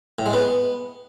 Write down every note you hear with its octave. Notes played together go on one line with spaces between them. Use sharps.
A2
G#3
B3